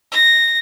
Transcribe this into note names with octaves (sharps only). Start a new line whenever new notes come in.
A#6